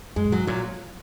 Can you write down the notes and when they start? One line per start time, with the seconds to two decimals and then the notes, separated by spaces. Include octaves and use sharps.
0.16 F#2 G#3
0.25 A#2
0.32 G#2 F#3
0.47 A#2 F#3